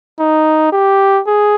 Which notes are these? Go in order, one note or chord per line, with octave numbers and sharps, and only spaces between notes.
D#4
G4
G#4